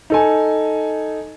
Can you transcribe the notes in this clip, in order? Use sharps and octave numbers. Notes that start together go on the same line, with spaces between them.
D#4 A4 G#5